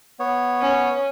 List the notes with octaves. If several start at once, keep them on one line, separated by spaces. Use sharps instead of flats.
B3 C#5
C#4